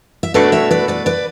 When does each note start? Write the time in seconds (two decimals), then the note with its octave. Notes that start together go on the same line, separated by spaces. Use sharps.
0.23 E5
0.34 B2 A3 D4 F#4 A4 B4 D5
0.52 C#5 E5
0.71 B4 D5
0.88 B4 D5
1.06 B4 D5